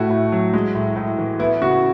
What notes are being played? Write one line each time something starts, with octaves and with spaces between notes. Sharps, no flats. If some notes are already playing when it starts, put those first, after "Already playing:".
Already playing: A2 A3 F#4
A2
F#3
G#3
A2
A2
E3
B3 E4
C#3 F#4